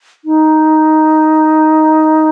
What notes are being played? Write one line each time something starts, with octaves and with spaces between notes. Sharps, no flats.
D#4